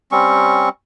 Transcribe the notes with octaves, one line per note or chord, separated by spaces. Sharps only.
G3 C4 C#4 C#6